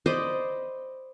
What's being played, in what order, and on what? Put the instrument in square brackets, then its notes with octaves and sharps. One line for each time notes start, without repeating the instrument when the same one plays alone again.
[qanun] C5 D5 D#5 B5